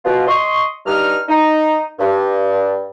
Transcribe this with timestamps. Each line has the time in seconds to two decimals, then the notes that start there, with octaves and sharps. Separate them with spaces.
0.05 B2 F4
0.27 D#5 C6 C#6
0.86 G2 D#4 F6
1.28 D#4
1.99 G2